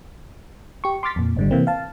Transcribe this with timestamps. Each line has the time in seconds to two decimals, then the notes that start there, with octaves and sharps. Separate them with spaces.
0.84 G4 C#6
1.03 C6 D6 F6 A6 B6
1.16 F2 A#2
1.37 G#1 D3 G3
1.51 C3 E3 A#3 C4
1.67 F5 A5